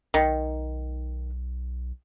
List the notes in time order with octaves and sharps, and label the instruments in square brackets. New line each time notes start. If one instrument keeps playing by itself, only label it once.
[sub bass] B1 [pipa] D#3